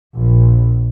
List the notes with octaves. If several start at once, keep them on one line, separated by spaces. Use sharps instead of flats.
A#1